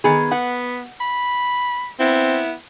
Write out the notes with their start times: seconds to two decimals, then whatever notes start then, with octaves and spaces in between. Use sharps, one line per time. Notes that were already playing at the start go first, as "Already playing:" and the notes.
0.04 D#3 B3 G#4
0.31 B3 F#5
1.01 B5
2.00 B3 C4 E4